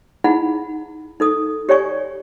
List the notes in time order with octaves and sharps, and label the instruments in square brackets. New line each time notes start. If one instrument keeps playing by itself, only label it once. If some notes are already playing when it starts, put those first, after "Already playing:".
[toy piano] D#4 E4 G#4 F#5 B5
D#4 A4 D#6
G4 C#5 D5 G#5 C#6